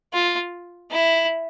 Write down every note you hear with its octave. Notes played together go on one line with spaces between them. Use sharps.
F4
E4